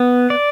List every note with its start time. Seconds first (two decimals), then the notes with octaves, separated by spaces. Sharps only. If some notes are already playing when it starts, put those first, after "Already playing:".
Already playing: B3
0.30 D5